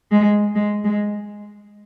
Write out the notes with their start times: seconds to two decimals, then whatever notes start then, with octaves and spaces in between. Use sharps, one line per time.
0.11 G#3
0.55 G#3
0.84 G#3